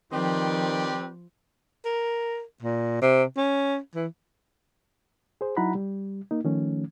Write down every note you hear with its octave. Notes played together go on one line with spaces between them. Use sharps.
D#3 F3 C4 G4 B4 D5
A#4
A#2
C3
C#4
E3
G#4 C5
F#3 D#4 E4 F#5 A#5 B5
G3
A#3 D#4
D#3 F3 A3 C#4